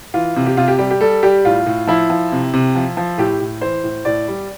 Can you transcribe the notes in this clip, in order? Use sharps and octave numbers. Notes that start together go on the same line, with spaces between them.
E3 F4
C3
G4
C3 F4
G4
G3 G4
G4
G3 A4
G3 G4
A2 F4
A2
F3 E4
F3
C3
C3
F3
F3
A2 G4
A2
E3 C5
A2
A2 D5
G3